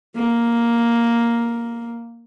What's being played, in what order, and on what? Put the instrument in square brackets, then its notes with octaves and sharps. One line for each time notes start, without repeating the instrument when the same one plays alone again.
[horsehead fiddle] A#3